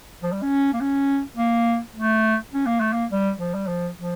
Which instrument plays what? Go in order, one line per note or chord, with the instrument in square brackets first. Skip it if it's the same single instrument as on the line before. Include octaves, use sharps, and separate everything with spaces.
[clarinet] F3
G3
C#4
A#3
C#4
A#3
A3
C#4
A#3
A3
A#3
G3
F3
G3
F3
F3